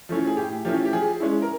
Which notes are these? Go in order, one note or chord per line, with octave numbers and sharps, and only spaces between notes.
F3 A3 C#4 E4
G#4
A2 G4
F3 A3 C#4 E4 G4
G4
F3 G#4
G#3 C#4 E4
A#4